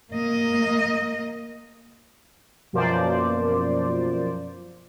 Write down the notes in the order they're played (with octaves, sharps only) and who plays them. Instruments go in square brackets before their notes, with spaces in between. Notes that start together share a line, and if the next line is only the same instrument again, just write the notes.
[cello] A#3 D#5
[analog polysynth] F#2 B2 F3 A#3 C5 D5